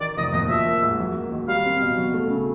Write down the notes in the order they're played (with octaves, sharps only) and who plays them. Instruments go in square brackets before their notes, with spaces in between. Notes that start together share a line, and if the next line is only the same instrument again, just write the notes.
[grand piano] D#3 [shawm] D5
[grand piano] F1 [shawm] D#5
[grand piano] D#2 [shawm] D#5
[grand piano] F3 [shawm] E5
[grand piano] A#3
G#2
F#3
A#3
D#3
[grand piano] G3 [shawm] F5
[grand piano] C4
B2
F#3
A3
C#3